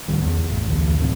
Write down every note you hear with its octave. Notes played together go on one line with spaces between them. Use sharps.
E1 C2 D#3 G3
E2 B3
A1
D2 E3
D#1 C#2 A2 C4